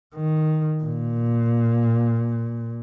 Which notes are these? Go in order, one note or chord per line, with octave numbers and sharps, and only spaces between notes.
D#3
A#2